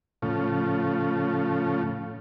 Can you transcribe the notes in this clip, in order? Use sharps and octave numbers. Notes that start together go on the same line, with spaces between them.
A2 C#3 F3